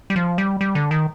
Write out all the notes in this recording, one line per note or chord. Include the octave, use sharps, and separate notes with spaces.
G3
F3
G3
G3
D3
D#3